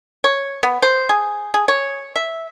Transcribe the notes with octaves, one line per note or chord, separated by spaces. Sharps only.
C#5
B3
C5
G#4
G#4
C#5
E5